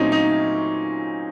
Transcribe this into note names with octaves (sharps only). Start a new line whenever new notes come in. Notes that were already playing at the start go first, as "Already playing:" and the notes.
Already playing: A#2 F#3 A3 C4 C#4 D#4
D#4